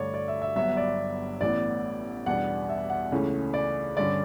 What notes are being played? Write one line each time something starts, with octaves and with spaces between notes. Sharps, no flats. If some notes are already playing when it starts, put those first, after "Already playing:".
Already playing: G2 D3 A3 D4 F#4 C#5 D5
D5
E5
E5
G1 G2 F#3 B3 F#4 E5
D5
A1 A2 E3 B3 D5
E2 B2 G3 B3 D4 F#5
E5
F#5
C#2 C#3 E3 A3 C#4
D5
G2 D3 G3 C#4 D5